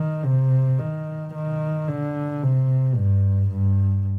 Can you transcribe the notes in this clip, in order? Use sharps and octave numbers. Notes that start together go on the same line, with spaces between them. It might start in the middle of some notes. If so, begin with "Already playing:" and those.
Already playing: D#3
C3
D#3
D#3
D3
C3
G2
G2